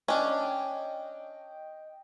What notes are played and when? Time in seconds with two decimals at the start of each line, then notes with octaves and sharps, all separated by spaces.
0.08 C#4 D4 D#5 G5